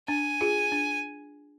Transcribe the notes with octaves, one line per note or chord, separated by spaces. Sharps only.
D4 G#5
F4 G#4
D4